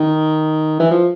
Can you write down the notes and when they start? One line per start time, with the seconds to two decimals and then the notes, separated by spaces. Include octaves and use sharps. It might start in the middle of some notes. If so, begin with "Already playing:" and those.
Already playing: D#3
0.80 E3
0.90 F3